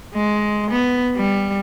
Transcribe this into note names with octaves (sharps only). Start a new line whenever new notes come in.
G#3
B3
G3